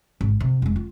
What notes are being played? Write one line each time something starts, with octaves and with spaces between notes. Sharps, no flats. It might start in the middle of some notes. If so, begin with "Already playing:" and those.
G#1
C3
F1 G#3
F4